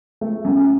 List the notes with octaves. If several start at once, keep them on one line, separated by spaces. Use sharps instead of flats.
A3
F#2